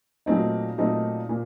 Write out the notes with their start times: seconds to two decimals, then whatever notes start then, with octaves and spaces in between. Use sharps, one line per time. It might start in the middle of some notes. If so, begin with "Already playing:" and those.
0.26 A#2 F#3 A3 C4 D#4
0.78 A#2 F#3 A3 C4 D#4
1.29 A#2